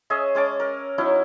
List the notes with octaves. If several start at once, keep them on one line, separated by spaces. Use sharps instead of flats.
C#4 G#4 D#5 E5
G#3 C#4 A5 D6
A#4
F#3 C#4 D#4 E4